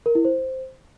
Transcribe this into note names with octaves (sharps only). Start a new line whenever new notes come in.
A#4
E4
C5